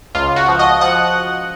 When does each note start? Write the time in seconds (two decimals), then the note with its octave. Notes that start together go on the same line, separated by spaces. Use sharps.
0.15 C#2 F4
0.36 F#4
0.48 F3
0.59 D#5
0.81 F3 F#5